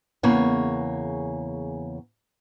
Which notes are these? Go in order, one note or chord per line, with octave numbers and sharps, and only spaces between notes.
E2 C#3 A#3 C#5